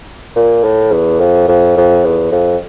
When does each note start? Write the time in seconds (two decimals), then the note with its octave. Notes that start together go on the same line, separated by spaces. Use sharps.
0.36 A#2
0.64 A2
0.92 E2
1.20 F2
1.48 F2
1.77 F2
2.04 E2
2.31 F2